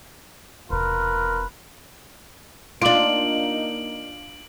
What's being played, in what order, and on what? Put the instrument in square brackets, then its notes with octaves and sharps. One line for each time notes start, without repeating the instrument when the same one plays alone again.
[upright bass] E1 C3 [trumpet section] F4 A#4 B4
[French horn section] A#3 D#4 [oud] D4 F4 [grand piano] F5 D6 [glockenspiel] D7 F#7